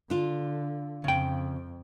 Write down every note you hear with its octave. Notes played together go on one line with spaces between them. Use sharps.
D3 D4 F4
F2 C#3 G5